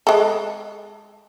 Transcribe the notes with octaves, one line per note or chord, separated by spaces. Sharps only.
G#3 A4